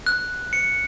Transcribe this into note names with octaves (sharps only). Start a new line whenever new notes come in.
F#6
C#7